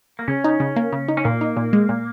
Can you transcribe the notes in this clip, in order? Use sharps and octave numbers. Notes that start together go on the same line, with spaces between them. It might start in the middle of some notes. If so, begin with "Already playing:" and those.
A#3
C#3 C#4
D#4
C#3
A#3
C#3
D#4
C#4
A#2 A#3
D#4
A#2
G#3
A#2